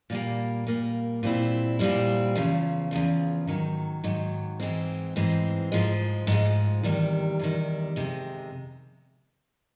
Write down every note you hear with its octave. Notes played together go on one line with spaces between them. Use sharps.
A#2 G3 A#3
A#2 G3 A#3
A#2 G3 C4 E4
A#2 G3 C4 E4
E2 C#3 F3
E2 C#3 F3
G#2 D#3 F#3
G#2 D#3 F#3
G#2 E3 G#3 C4
G#2 E3 G#3 C4
G#2 F3 G#3
G#2 F3 G#3
E2 C3 D#3 G3
E2 C3 D#3 G3
F2 C3 D#3 G#3